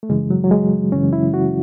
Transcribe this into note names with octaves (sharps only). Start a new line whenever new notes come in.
A3
F#2 C#3 E3 G#3
F#3
F#3
G#3
F#2 C#3 E3 C#4
E4
F#4